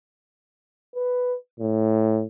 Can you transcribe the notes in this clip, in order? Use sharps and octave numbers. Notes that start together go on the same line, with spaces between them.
B4
A2